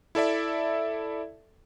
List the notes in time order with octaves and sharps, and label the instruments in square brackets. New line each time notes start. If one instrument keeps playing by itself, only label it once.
[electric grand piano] E4 A4 D5 E5